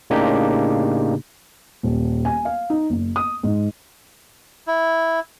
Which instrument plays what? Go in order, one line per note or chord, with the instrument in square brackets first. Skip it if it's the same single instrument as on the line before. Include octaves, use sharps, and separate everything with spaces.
[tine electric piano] A2 C#3 A#3 D4 D#4 G4
[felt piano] D#1
G#5
F5
D#4
F#1
D#6
G#2
[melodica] E4